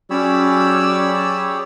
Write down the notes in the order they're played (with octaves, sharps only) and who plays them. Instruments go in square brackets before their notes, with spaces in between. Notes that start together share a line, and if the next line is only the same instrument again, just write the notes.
[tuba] F#3 [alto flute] C#4 [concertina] G4 G#4 C#5 [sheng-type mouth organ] D5 B5 E6